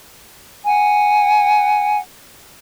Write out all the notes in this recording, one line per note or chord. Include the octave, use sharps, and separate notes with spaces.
F#5 G#5